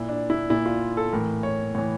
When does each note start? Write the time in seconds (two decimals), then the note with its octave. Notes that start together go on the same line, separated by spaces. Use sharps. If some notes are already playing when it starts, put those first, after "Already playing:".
Already playing: A#2 E4
0.09 D4
0.30 E4
0.50 A#2 E4
0.66 F4
0.97 A4
1.13 A2 E3 A#4
1.43 C#5
1.75 A2 E3 C#5